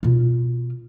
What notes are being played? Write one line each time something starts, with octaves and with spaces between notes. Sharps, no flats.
B2 F4